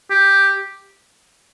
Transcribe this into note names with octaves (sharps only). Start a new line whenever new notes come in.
G4